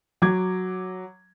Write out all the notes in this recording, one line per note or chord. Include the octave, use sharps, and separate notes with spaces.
F#3 D6 G#6